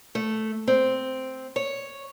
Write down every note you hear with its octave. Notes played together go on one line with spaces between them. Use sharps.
A3
C4
C#5